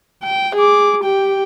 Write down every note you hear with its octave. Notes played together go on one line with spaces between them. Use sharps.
G5
G#4 D6
G4 G5